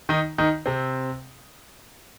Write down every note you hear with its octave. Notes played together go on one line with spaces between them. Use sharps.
D#3 D#4
D#3 D#4
C3 C4